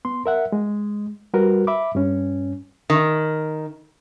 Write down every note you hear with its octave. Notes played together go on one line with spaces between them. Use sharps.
B3 C6
A#4 E5 F#5
G#3
G3 F#4 A#4 B4
E5 B5 D6
G2 C#4
D#3